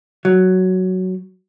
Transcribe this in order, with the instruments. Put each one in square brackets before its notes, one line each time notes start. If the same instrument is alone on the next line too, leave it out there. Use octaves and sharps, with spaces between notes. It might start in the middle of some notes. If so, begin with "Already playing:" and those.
[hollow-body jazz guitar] F#3